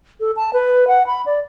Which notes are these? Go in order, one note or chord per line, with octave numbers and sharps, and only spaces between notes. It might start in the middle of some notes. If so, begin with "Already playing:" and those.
A4
A5
B4
F#5
B5
D5